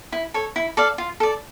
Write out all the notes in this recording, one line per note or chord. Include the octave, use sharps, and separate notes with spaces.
E4
A4 C#5
E4
A4 D5 F5
F4
A4 D5